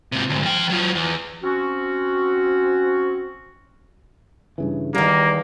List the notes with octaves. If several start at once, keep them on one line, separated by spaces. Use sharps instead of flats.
G#2 C3
D2 G#2
F3 G5
F#3 F4
E2
C4 C#4 F#4
G2 C#3 E3
E2 D#3 G3 A#3